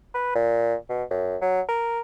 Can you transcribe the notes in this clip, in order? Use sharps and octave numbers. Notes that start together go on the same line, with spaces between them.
B4
A#2
B2
F#2
F#3
A#4